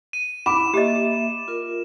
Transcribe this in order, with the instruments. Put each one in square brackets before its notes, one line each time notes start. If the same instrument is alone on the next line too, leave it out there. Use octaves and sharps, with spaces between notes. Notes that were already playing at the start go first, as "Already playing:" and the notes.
[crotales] D#7
[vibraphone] E4 [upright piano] B5 D6 [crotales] E7
[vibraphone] A#3 E5 [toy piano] G4 D#5
[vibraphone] F4 A#4